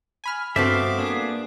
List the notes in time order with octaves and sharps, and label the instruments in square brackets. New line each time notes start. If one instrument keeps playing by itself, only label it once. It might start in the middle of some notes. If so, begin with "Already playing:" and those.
[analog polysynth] G#5 B5 F6
[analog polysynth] G2 [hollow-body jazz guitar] A3 C4 F#4 [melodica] B3 D6 [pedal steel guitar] E5 F5
[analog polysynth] A#3 [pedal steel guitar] D4 G#4